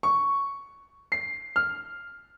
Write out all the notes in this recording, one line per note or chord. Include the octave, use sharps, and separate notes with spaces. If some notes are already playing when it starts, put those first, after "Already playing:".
C#6
C7
F6